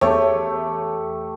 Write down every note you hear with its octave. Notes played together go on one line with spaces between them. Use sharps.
E2 A3 G4 C#5